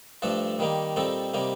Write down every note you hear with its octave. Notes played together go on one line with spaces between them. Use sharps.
G2 F3 A3 D4 A4
D#3 G3 A#3 D#4
A#2 G3 C4 D#4 A4
C3 G3 A#3 D#4